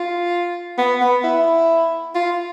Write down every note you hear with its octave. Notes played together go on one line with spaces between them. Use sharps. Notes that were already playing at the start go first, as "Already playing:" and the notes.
Already playing: F4
B3
B3
E4
F4